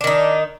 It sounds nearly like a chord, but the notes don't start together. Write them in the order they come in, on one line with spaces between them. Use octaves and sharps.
D4 D#3 D#4